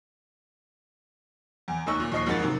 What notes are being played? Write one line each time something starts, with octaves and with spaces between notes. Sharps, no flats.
E2
F1 D#2 D#4 C#6 E6 F#6
A#2
D#2 F3 D#5 C#6 C7
F2 G#2 A#3 F#4 F#5 A6
F#2 C3 D#3